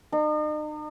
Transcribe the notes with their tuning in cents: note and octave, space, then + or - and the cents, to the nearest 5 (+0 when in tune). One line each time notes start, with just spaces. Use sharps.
D#4 -40